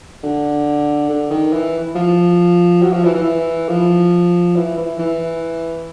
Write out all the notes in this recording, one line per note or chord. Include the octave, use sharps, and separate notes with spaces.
D3
D3
D#3
E3
F3
F#3
F3
E3
E3
F3
E3
E3
E3